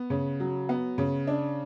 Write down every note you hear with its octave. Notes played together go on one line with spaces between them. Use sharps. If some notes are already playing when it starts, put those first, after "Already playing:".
Already playing: B3
C#3
F#3
B3
C#3
D4